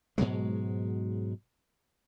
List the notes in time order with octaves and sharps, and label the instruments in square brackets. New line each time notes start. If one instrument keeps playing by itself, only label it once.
[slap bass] G#2 B2 F#3 G#3